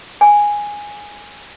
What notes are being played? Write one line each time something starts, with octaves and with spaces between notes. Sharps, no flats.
G#5